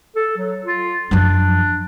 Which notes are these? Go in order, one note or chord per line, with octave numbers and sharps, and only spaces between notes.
A4
F#3
F4
F#2 F3 D4